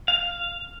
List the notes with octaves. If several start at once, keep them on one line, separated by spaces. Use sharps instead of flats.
F5